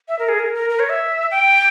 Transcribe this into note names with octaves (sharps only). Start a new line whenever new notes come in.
E5
A#4
G#4
A#4
A#4
A#4
C#5
E5
G5